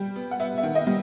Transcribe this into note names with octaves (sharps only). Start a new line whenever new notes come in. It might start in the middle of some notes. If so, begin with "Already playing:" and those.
Already playing: G3 G5
B3
F#5
B3 E5
E5
D#3
D#5
G3